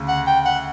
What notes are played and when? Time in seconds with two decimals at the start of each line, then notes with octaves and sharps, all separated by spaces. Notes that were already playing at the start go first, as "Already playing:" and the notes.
Already playing: D2 C#3
0.08 F#5
0.27 G5
0.46 F#5